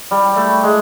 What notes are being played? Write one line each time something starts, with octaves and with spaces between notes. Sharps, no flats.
G3
A3
G#3